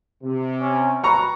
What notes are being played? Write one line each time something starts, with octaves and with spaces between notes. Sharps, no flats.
C3
C#4
B4 A#5 C#6